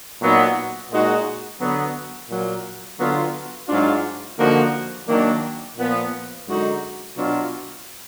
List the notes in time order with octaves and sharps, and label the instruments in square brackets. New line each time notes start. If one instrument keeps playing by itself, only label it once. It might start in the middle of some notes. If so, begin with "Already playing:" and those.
[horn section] A#2 F#3 B3 D#4
A#2 G#3 D#4 F#4
D3 F#3 B3
A#2 F#3 A#3
D3 F#3 B3 F4
G#2 F#3 D4 F4
D3 F3 A#3 D#4 F#4
D#3 F#3 A#3 D4
A#2 F3 B3
F#2 D3 G#3 D#4 F#4
B2 F#3 D4 F4